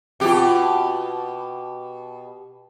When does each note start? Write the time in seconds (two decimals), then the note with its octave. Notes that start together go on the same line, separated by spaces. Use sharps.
0.20 B2 C4 F4 G4